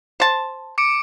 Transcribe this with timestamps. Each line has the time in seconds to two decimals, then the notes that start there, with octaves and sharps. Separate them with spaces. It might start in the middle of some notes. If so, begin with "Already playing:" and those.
0.20 C5 A5
0.78 D6 C#7 D7